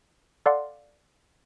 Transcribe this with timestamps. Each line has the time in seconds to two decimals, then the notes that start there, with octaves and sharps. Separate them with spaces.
0.46 A4 D5 F5 F#5 C6